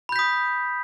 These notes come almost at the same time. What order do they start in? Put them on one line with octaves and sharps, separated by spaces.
B5 G6 B6 D#6